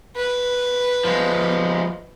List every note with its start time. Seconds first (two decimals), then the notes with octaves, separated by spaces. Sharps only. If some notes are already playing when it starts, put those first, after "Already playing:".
0.16 B4
1.04 F3 G#3